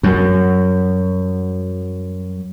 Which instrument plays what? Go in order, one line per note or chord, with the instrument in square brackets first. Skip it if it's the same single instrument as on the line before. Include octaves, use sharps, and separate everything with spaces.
[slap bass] F#2 [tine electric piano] F#3